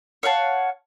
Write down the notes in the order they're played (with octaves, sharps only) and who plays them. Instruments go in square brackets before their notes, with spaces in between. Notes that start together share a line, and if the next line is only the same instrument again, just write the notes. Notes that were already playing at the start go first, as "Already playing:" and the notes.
[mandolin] C#5 F5 F#5 A5